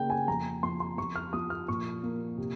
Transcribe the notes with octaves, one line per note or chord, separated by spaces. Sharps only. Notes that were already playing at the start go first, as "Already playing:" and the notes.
Already playing: C#3 A#3 G5
G#5
F2 A#5
F3 C6
C6
F2 C#6
F6
F3 D#6
F6
A#2 C#6
A#3
C3